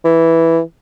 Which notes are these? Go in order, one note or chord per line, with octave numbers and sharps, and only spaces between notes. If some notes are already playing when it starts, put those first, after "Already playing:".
E3